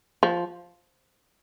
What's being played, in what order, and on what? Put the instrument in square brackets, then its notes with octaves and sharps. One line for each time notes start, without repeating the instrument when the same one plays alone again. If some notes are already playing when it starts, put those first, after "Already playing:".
[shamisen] F3